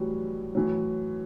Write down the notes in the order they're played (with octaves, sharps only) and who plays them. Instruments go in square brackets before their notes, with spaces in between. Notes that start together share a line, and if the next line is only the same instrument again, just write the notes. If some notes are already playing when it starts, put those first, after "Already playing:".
Already playing: [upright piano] A2 E3 F#3 G3
A2 E3 F#3